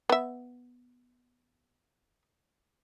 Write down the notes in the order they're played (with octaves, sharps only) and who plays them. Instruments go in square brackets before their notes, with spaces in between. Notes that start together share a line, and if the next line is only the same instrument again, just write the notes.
[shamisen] B3 E5